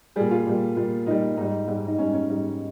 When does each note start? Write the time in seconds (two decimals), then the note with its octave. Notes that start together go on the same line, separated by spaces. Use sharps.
0.16 A#2 G3 G#4
0.31 F4
0.46 A#2 G3
0.76 A#2 G3
1.06 A#2 G3 D#4
1.37 G#2 G3 D#4
1.67 G#2 G3
1.87 D#4
1.98 G#2 G3 C#4
2.13 C#4
2.29 G#2 G3 D#4